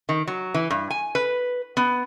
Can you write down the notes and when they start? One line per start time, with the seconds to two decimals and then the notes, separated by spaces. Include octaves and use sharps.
0.09 D#3
0.27 F#3
0.54 E3
0.70 G2
0.90 G#5
1.15 B4
1.77 B3